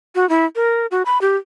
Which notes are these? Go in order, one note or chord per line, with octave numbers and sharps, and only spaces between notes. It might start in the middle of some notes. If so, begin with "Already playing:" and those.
F#4
E4
A#4
F#4
B5
G4